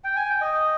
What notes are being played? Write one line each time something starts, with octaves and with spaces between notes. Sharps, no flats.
G5
G#5
G5
D#5